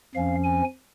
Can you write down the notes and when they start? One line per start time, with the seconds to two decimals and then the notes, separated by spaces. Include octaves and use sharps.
0.15 F2 F3 C#4 F5
0.44 G#5